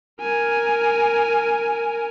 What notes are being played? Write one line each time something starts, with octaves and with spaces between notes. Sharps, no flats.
A#4 G#5